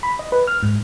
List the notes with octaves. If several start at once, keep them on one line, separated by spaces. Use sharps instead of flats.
B5
D#5
B4
F6
G#2